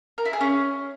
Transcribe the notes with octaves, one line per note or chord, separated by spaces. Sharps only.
A#4
E4
G#4
C#4